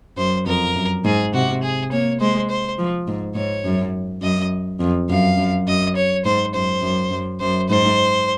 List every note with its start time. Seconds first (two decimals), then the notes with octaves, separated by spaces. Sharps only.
0.17 F#2 C5
0.46 F2 A#4
0.76 F#2
1.05 G#2 G#4
1.34 C3 F#4
1.63 G#4
1.92 A#3 C#5
2.20 G#3 C5
2.50 C5
2.78 F3
3.08 G#2
3.35 G#2 C#5
3.65 F#2
4.22 F#2 D#5
4.80 F2
5.09 F#2 F5
5.38 F#2
5.67 F#2 D#5
5.96 C#5
6.25 G#2 C5
6.54 F#2 C5
6.83 F#2
7.11 F#2
7.40 F#2 C5
7.69 G#2 C5